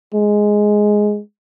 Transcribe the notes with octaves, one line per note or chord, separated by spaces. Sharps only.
G#3